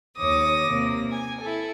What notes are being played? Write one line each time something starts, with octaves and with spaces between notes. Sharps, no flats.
D#2 C#5 D6 D#6 A#6
C3 A#3
G#5
E4 A4